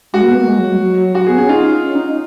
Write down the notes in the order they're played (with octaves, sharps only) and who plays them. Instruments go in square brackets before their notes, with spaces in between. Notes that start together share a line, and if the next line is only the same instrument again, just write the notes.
[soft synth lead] G#3 [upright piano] F#4
[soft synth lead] A#3
B3
A#3
G#3
F#3
F#3
F#3
[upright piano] F#4
[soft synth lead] B3 [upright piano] G#4
[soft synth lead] C#4 [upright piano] G#4
[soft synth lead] D#4 [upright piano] F4
[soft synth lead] C#4
D#4
D#4